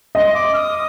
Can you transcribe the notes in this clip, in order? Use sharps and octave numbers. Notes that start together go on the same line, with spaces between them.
D#5 C6
C6
D6
F6
D#6